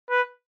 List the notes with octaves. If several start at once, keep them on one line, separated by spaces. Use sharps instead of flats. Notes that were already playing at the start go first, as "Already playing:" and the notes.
B4